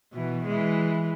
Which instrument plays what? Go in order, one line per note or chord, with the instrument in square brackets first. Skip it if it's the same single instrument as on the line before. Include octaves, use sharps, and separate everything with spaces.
[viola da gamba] B2 E3
E3 G#3